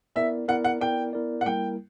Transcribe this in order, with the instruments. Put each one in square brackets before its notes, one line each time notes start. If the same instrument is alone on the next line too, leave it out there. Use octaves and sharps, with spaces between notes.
[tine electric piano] B3 E4 A#4 D5 [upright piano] E5
[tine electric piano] B3 E4 A#4 D5 [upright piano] F#5
[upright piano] F#5
[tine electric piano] B3 E4 A#4 D5 [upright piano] G5
[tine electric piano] B3 E4 A#4 D5
[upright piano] F#5
[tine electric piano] G3 A#3 E4 A#4 [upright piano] G5